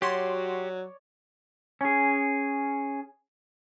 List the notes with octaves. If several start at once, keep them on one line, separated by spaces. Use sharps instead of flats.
F#3 F#4 G4 C#5 D5 C6
C#4 G#4